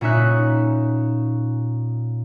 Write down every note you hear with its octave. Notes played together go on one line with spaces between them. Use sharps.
A#2 C#4 D#4 E5 F#6